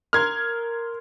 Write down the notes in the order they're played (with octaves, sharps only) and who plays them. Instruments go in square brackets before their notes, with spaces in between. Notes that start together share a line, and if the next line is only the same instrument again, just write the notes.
[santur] A#4 C6 [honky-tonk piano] F6 G#6